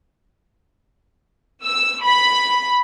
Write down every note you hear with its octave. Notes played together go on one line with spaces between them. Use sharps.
E6
B5